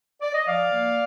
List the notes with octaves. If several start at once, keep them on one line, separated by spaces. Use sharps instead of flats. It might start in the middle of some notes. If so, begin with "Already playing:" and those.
D5
D#5
F3 D5 F5
A#3